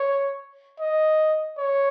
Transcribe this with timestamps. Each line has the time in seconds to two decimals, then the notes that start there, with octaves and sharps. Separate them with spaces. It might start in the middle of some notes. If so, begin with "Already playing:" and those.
Already playing: C#5
0.80 D#5
1.58 C#5